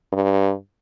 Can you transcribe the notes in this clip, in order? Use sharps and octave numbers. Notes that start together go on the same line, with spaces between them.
G2